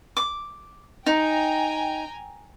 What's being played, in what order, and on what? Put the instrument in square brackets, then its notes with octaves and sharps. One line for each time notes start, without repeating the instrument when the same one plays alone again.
[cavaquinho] D6
[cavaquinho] D#4 [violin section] G5 G#5 A#5